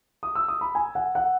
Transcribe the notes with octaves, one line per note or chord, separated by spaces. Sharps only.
D#6
E6
D#6
B5
G#5
F#5
F#5